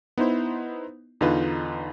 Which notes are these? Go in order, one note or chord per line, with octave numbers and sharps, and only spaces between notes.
B3 D#4 E4 C5
E2 D3 D#4 F4 B4